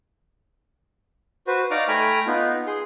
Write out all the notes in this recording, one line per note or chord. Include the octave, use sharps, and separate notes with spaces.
F#4 B4 C5
D#4 D5 F5 A#5 C#6 D6
A3 G5 G#5 A#5 B5 F6
B3 D#4 F4
G#4 C6